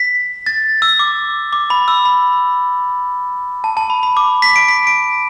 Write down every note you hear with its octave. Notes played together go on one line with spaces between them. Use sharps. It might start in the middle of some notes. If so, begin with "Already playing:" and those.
Already playing: B6
A6
E6
D6
D6
B5
E6
B5
A5
A5
B5
B5
D6
B6
D7
B6
D7